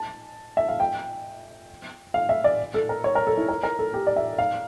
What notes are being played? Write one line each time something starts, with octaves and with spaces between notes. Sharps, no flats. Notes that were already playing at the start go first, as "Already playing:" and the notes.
Already playing: A5
E5
F5
G5
F5
E5
D5
A4
A#4
C#5
A#4
A4
E4
A#4
A#4
A4
G4
D5
E5
F5